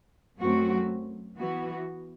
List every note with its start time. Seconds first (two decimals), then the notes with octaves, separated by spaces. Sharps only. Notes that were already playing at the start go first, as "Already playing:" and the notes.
0.38 F#2 F#3 A3 C4 F#4
1.37 E3 B3 F#4